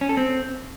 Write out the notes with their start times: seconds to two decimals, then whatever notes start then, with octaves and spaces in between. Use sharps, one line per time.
0.01 C#4
0.09 A4
0.17 C4